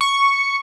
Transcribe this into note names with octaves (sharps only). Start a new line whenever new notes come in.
C#6